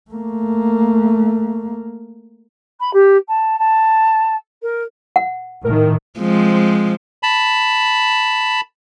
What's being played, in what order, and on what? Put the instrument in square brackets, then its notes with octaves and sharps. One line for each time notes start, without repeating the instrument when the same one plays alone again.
[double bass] A3 A#3
[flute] B5
G4
A5
A5
A#4
[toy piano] F#5
[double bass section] A2 D#3 [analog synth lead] A#4
[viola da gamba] F3 G#3 C4
[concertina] A5 B5